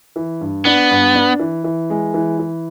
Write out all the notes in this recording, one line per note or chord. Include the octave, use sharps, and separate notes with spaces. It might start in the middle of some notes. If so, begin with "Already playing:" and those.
E3
G2
B3 D4
G2
D4
E3
E3
G#3
E3
E3